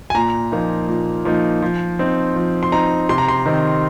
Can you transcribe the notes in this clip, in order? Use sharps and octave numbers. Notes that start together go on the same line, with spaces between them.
G#5
A#2 A#5
F3 A#3 D#4
A#2
F3 A#3 D#4
F3
C4 D#4
F3
C6
C4 D#4 A#5
C3 C6
A#5
C6
D#3 C4 D#4